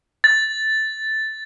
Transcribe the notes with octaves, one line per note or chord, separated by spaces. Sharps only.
A6